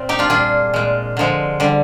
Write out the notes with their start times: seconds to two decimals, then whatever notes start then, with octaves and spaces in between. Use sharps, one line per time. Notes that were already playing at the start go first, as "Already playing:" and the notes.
Already playing: A#2 C4
0.09 D#4 G4
0.19 D4 F4
0.30 A#2 G3 F4 G#4
0.74 A#2 G#3
1.17 D3 F3 G#3
1.60 D3 G3